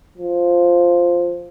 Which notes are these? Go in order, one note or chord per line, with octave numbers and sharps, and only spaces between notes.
F3